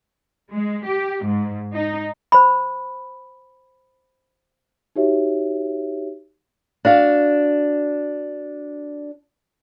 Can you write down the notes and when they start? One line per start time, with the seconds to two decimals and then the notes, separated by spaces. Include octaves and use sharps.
0.51 G#3
0.84 G4
1.23 G#2
1.73 D#4
2.32 C5 B5
4.96 D#4 F#4 G4 C#5 E5
6.85 D4 F#4 F5